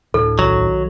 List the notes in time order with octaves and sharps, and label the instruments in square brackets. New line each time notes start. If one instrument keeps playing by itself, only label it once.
[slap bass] D2 A2 [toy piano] A4
[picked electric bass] B1 D#3 [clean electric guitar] F#3